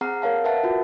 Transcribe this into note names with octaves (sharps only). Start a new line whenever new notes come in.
C4 G#4 F#5 A#5 F6 C7
A#4 C#5 F5 A5
A#4 B4 E5 F#5 A5
F4 F#4